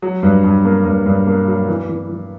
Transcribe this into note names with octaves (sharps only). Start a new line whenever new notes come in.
F#3
G2
G2
A#3
G2
G2
A#3
F#3
E3
E3
E3